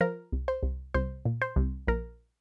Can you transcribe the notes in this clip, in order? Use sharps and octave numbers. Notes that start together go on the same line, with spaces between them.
F3 A#4
C2
C5
C2
C2 C5
A#2
C5
C2
A#1 A#4